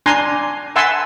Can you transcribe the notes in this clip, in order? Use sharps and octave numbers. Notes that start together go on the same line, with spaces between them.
D4 G#5 A#5 C6
E5 F#5 G#5 A5 C6 E6